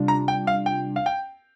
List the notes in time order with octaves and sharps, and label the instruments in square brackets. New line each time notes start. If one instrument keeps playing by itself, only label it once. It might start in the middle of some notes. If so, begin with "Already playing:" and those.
Already playing: [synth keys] C3 G3 D4 F4
[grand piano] A#5
G5
F5
G5
F5
G5